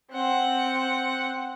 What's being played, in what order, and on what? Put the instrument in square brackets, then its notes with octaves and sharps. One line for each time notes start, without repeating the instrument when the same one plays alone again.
[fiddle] C4 F#5